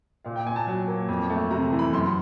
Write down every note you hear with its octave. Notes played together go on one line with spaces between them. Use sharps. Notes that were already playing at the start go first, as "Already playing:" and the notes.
A#2 F5
G5
A#2 G#5
A5
F#3
A#3
F2
A3
C3 A#5
E3
B5
F#2 C6